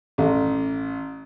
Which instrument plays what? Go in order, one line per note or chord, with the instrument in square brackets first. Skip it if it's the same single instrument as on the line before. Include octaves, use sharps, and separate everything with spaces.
[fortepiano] A1